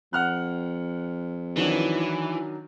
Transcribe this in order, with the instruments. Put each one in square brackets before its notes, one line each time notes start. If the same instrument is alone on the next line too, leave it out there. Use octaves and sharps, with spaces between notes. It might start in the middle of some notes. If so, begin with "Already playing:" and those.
[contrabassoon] F2 [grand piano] F#5 F6 F#6
[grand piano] D#3 F#3 D4 [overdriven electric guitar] E3